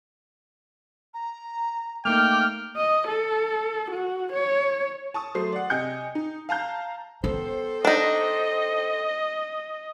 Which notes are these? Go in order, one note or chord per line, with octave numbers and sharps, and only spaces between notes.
A#5
A3 A#3 D#4 G5 D6 F6
D#5
A4
F#4
C#5
A5 C#6 D#6
F#3 A3 C5 C7
D5 F#5
C3 D#5 G5 G#5 G6 C#7
D#4
F5 A5 A#5 G6
B3 A4 C5 G5
D4 D#4 D#5